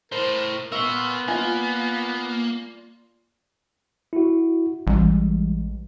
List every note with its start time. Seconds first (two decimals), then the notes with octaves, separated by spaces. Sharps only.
0.12 A2 A#4 C5
0.72 B3 A#4 F5 C6 C#6 E6
1.28 A#3 F4 D5 G#5
4.13 E4 F#4
4.87 A1 E3 G3 G#3